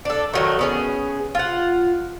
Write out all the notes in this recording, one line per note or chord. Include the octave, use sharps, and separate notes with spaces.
D4 A4
D#3 F#3 A3
B3 C#4 G#4
F4 F#5